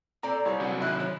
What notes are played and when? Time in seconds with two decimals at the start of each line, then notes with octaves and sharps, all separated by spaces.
0.23 A#2 C4 A4 D5 A#5
0.45 C2 G4 C#5
0.60 C3 F#3 F#5
0.81 G#1 F3 E4 F#6
1.00 C#5